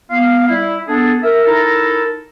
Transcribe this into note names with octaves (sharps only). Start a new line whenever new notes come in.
B3 F5
G3 E4
B3 D4 G#4 A4
A#4 E5
D#4 E4 A4 A#4